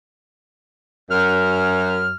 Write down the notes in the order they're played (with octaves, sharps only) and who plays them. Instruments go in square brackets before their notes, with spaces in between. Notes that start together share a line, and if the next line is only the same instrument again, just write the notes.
[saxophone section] F#2 [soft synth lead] F6